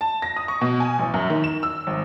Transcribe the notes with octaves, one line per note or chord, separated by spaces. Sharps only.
A5
A#6
D#6
C#6
B2
G#5
A1
F#2
D#3
E7
E6
G#1